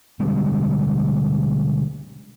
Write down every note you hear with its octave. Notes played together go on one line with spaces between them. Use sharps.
B2 D3 G3 G#3